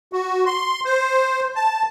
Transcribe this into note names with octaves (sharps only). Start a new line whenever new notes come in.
F#4
C6
C5
A5